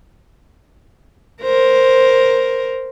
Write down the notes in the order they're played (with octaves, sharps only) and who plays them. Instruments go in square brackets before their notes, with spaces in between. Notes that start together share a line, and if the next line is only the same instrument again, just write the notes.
[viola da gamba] A#4 C5